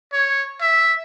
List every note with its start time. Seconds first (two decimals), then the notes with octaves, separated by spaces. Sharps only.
0.13 C#5
0.61 E5